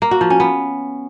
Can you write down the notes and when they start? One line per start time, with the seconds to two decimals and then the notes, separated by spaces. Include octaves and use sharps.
0.02 A#3
0.11 F#4
0.21 F3
0.30 C#4
0.40 B3